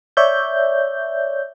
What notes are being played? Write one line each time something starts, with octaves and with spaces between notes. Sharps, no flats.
C#5 D5 E5 G6